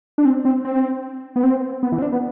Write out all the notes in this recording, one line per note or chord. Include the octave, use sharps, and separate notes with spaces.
D4
C4
C4
C4
B3
C4
B3
E3
C4
D4
B3